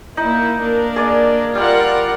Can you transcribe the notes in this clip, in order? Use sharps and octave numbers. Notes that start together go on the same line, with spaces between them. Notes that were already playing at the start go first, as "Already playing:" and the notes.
A#3 D#4 E4
A#3 D4 A#4
G#4 D5 D#5
G3 F4 A#4 F#5 E6